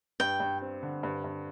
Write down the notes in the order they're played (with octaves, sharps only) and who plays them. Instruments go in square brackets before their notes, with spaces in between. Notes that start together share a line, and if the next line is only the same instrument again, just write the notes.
[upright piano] G2 [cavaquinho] G5
[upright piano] G2
C4
D3
G2
G2